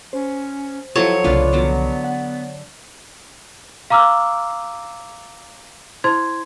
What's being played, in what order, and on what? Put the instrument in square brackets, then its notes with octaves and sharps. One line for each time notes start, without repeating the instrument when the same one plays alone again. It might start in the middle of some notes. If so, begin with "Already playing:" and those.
[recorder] C#4 [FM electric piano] C5
[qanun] F3 F#3 A4 [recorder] E4 [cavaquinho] C#5
[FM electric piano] C2 C#3 F3 [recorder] A#3 [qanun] D4 F4 B4
[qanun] D3 F#3 [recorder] B3
[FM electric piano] F#5
[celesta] F5 A#5 D6 E6 F6
E4 C5 C6 G#6